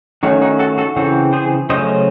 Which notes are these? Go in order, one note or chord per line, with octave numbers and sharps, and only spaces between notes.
D#3 A3 C#4 D#4 F#4
D#4 F#4
F#4 A4
F#4 A4
C#3 E3 C4 F#4 A4
G#4 C5
C#3 F#3 A3 C#4 C5 D#5